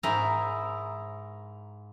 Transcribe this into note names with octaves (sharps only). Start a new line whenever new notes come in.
G#2 E4 A#4 D#5 E5 A#5